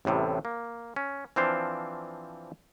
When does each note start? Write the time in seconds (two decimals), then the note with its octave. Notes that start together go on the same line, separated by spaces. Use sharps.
0.05 A1 E2 A2 C3 G3
0.45 A#3
0.96 C#4
1.36 E3 F3 C4 D4 C5 F5